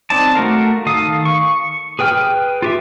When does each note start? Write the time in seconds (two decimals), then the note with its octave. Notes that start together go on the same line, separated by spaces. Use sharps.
0.10 C4 D#4 D5 A5
0.35 A3 F#4 A#4 F5
0.86 D#3 A4 F5 D#6
1.25 C#6
1.99 G#4 B4 G5 F6
2.62 F4 G4 E5